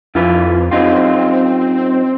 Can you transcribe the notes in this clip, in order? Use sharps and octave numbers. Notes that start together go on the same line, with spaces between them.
F2 E4 F4 B4
F#2 C4 D#4 F4